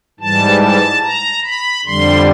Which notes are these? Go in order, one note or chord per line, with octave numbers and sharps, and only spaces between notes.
G#2 E3 G3 A5
A5
A#5
B5
F2 D3 G3 C6